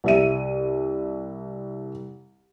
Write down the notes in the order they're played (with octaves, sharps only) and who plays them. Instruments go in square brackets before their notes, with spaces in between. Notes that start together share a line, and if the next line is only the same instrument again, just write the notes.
[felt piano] C2 E5 D#7